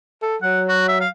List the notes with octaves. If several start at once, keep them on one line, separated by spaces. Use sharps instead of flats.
A4
F#3 F#5
F#4
E5
F5